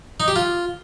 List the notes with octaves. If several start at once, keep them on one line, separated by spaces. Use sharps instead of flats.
D#4
G4
F4